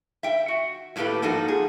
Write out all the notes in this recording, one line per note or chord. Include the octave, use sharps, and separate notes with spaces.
E5 G5
F#4
A2 F#3 A#3 G4 A4 B4
G#2 F3 A#3 D#4 F#4 A4
G#4